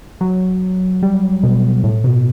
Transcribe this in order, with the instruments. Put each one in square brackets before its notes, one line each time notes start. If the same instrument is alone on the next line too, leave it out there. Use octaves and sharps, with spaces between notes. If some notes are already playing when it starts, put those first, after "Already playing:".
[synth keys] F#3
G3
B2
A2
B2